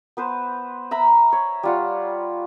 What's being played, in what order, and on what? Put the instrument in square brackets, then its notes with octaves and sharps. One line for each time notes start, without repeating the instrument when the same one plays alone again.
[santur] B3 B4 C5
E5 A#5 B5
C#5
G3 F4 F#5